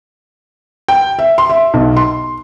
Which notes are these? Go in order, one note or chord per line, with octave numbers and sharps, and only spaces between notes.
G5
E5
C6
E5
B1
C6